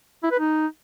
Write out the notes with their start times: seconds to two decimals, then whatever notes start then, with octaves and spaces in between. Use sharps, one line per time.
0.23 E4
0.31 B4
0.40 D#4